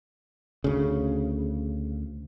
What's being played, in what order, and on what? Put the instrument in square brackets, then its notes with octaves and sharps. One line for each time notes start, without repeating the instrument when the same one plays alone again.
[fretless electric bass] D2 C#3